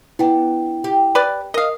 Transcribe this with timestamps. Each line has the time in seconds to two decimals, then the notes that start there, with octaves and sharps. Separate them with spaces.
0.19 B3 D4 E4 G5
0.84 G4
1.15 B4 D5
1.54 A#4 D#5 F5 D#6